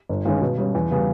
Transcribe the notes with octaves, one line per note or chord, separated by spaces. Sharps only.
G1
G2 D#3 G#3 C#4
B2
G3 C#4
E2
C#3 G3 B3